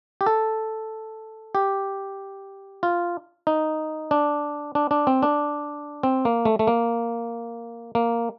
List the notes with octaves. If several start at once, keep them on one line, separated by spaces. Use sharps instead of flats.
G4
A4
G4
F4
D#4
D4
D4
D4
C4
D4
C4
A#3
A3
A3
A#3
A#3